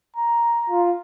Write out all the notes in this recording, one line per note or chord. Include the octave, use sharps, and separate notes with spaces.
A#5
F4